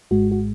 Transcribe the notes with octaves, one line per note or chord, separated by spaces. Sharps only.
G#1 G#2 G#3 F#4
F#4